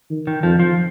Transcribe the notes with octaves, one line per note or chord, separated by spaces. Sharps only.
D#3
D#3
F2 F3
F3